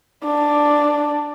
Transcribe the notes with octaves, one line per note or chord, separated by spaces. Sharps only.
D4